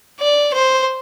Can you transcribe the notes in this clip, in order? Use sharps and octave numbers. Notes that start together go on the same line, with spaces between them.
D5
C5